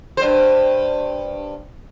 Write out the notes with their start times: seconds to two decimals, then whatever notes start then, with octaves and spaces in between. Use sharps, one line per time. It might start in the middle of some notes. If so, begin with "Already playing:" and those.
0.17 G2 C5